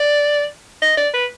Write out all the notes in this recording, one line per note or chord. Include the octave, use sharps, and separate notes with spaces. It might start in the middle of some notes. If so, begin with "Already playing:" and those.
Already playing: D5
D#5
D5
B4